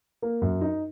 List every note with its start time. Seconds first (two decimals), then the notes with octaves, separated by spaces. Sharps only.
0.22 A#3
0.42 F#2
0.61 D#4